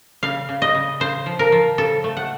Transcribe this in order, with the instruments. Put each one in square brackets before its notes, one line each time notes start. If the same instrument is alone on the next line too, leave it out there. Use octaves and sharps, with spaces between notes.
[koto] C#3 F5
C#3
D#5
C#3
C#3 C5
F3
A#4
F3
C#3 A4
A3
F#5